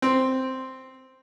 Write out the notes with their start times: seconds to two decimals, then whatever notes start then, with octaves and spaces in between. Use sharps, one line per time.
0.02 C4